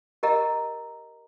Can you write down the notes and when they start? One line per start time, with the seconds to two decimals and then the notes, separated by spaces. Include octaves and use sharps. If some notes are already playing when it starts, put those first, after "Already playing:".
0.23 G4 A#4 D#5 A#5